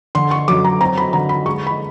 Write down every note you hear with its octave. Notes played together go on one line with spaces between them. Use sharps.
D3 C6
C#6
F#2 D6
A#5
C4 A#5
B5
D3 A#5
B5
G#3 C#6
B5